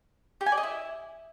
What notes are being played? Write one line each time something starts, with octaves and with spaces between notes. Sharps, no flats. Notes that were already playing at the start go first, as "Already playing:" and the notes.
G4
G#5
D5
D#5
E4